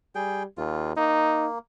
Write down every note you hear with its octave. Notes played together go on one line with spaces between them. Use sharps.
G3 G#4 G5
D#2 F4
A#3 D#4